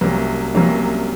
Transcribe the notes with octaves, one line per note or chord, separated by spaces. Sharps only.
C2 C3 F#3 A#3 C#4
C2 C3 F#3 A#3 C#4